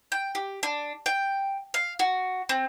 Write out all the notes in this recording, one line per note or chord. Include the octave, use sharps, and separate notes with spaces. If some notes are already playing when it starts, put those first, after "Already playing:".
G5
G4
D4
G5
F5
F#4
C4